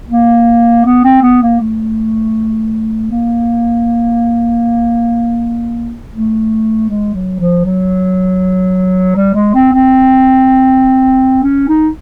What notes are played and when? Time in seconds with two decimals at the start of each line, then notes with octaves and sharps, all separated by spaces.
0.09 A#3
0.86 B3
1.04 C4
1.22 B3
1.42 A#3
1.61 A3
3.11 A#3
6.14 A3
6.89 G#3
7.15 F#3
7.40 F3
7.65 F#3
9.16 G3
9.35 G#3
9.55 C4
9.73 C4
11.43 C#4
11.69 D#4